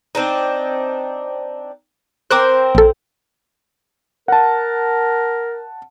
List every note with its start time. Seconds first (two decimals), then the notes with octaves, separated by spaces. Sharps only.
0.15 C4 D4 D#4
2.31 C4 A#4 C5 D6 F#6
2.75 A#1 A4
4.28 A#4 F#5 A5